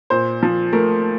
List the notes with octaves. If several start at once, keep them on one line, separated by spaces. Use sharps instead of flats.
A#2 C5
F3
A3 A#4